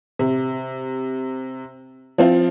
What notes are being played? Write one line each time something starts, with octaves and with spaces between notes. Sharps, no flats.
C3
F3 C4 F4